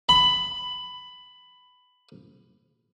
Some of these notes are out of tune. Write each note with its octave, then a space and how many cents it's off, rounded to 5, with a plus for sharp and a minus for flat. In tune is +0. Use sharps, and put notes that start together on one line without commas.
B5 +15